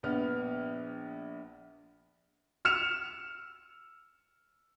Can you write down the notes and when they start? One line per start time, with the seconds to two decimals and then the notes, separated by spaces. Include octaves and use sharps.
0.03 A#1 B3 F6
2.65 E6 F6 C#7 E7 F7